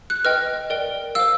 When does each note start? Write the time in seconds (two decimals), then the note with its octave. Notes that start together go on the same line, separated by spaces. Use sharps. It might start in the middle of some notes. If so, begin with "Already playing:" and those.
0.10 F#6
0.25 B4 D#5 G5 F6
0.70 A#4 D5 G5
1.15 C5 F5 E6